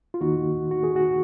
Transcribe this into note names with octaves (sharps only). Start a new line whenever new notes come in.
F4
D#2 D#3 A#3 D#4 F#4
F#4
G#4
F#4